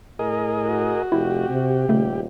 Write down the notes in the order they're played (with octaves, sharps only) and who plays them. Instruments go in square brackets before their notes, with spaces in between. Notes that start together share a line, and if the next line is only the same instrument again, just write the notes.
[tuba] A2 [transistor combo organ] G#4 A#4 D#5
[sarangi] F#4
[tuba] F1 [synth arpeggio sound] E4 [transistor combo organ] G4
[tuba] C3
[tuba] D#1 [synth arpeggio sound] C#3 A3